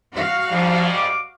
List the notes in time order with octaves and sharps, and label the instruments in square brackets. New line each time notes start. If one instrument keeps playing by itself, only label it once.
[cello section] F#4 F5
[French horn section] G#2 G3 [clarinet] F3
[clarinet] D6